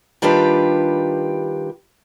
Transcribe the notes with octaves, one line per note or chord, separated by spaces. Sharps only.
D#3 G3 D4 F4 G4 B4